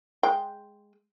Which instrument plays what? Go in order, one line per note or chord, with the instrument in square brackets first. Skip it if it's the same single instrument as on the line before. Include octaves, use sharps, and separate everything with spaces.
[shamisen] G#3 G5